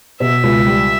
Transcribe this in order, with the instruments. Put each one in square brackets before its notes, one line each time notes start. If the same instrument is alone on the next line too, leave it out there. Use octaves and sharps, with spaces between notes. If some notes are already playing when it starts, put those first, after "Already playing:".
[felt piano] B2 [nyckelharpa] E5
[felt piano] C#2
G3